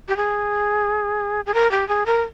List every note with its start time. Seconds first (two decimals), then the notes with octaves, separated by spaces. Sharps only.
0.08 G4
0.17 G#4
1.46 G#4
1.54 A#4
1.71 G4
1.88 G#4
2.06 A#4